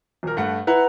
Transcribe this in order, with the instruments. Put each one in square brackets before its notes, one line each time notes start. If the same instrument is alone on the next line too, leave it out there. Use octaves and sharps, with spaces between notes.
[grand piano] D#1 A#4
G2 A3 F#5
[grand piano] E4 [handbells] B4 F#5 A#5